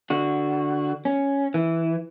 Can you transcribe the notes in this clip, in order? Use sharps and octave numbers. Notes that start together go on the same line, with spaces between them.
D3 F#4
C#4
E3